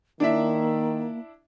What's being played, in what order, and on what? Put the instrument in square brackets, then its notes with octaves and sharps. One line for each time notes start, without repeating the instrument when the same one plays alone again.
[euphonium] D#3 [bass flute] A#3 [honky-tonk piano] D4 E4 E5